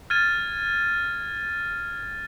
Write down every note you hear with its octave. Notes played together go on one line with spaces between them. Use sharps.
F6 G#6 A6 D#7